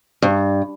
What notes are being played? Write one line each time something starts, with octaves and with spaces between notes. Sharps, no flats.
G2